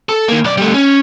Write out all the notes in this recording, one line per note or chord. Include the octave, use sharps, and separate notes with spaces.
A4
D#3 A#3
B1 D5
G3 A3
C#4